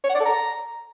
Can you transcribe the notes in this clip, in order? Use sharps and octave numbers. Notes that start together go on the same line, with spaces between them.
C#5
F#5
D5
A4
A#5